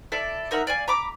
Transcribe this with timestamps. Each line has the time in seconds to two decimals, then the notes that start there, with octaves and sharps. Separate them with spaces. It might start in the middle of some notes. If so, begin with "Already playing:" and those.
0.12 E4 A4 D5
0.51 D#4 A#4 E5 F#5
0.67 D5 F5 G#5
0.88 A#5 B5 D6